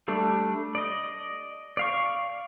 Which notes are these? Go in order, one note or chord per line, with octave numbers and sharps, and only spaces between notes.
G3 A3 D4
D5 D#5
D5 F5 C#6